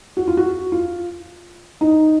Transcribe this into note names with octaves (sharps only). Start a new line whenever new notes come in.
F#4
F4
F#4
F4
D#4